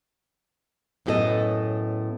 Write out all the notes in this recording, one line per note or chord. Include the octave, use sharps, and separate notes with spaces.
F#2 A2 B3 G4 A4 D#5